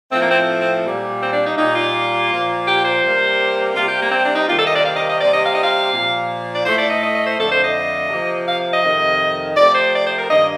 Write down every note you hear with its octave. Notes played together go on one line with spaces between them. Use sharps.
A2 F3 A3 C4
A#3
C4
C4
A#2 G3 A#3
C4
D4
D#4
A#2 G3 A#3 D#4
F4
A#2 F3 A#3
G4
C5
C3 G3 A#3
C3 G3 A#3 F4
G4
A#3
C4
D4
D#4
C3 D#3 G3 A#3 F4
A4
D#5
D5
F5
D#5
D#5
C3 G3 A#3 D5
D#5
F5
D#5
F5
A#2 F3 A#3
D5
A2 A3 C5
D5
D#5
D#5
D#5
C5
F2 D3 A3 A4
C5
D#5
C3 F3 A#3
F5
D#5
F2 C3 D#3
C3 F3 A3 D5
C5
D5
C5
A#4
G2 D#3 A#3 D#5